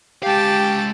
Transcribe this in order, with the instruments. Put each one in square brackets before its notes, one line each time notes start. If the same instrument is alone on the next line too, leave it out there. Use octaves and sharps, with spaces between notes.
[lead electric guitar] G#3 F5 [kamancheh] G4 [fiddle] G5 A5